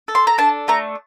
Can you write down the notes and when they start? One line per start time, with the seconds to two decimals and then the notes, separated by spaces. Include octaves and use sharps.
0.08 A4
0.15 C6
0.27 A#5
0.38 D4 A5
0.68 A3 A#5